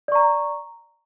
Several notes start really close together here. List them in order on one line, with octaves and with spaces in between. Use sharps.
D5 C#6 A#5